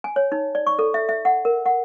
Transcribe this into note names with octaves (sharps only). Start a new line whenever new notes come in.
G#5
C#5
D#4
D5
C#6
A4
E5
E5
F#5
A#4
F#5